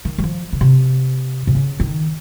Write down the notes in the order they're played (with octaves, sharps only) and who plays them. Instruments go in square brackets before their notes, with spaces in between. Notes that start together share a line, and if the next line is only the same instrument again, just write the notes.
[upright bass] D#3
G3
F3
C#3
C3
C3
C#3
D#3